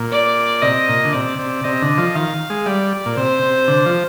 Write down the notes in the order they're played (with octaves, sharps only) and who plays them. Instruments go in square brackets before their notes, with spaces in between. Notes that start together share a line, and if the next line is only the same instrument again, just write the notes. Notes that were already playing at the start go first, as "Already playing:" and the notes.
Already playing: [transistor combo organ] A#2
[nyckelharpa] D5
[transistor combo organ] C3 [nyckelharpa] D#5
[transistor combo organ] A#2
D3
[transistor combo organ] C3 [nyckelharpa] D5
[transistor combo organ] C3
[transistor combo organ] C3 [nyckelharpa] D#5
[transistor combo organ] D3
F3
[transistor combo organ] D#3 [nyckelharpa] F5
[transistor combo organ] G#3
[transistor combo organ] G3 [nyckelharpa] D5
[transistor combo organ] A#2
[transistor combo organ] C3 [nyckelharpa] C5
[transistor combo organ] C3
D3
F3